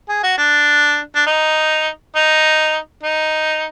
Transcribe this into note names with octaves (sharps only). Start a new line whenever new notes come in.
G#4
F#4
D4
D4
D#4
D#4
D#4